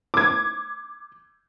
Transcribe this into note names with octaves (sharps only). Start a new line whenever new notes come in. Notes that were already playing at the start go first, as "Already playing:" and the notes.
D6 G#6